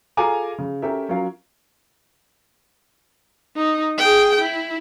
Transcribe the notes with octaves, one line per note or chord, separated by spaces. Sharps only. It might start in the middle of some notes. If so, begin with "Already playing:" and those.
F4 G#4 A4 G#5 A#5 D6
C#3
C#4 G4 A4 A#4 E5
F#3 C#4 F4 A#4 F5
D#4
G#4 G5
E4